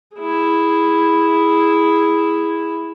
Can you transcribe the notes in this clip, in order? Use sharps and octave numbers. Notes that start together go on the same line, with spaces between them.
E4 G#4